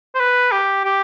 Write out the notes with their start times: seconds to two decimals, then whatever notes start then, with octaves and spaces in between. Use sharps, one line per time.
0.15 C5
0.20 B4
0.52 G4
0.85 G4